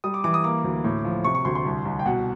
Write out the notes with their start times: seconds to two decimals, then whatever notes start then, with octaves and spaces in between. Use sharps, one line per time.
0.04 G3 D#6
0.14 D6
0.24 E3 D6
0.34 D#6
0.44 A#3 D6
0.64 D2
0.84 A2
1.05 F3
1.24 C3 C#6
1.35 C#6
1.45 D2 C6
1.55 C6
1.65 C2
1.85 C2
1.99 G5
2.06 B2 F#5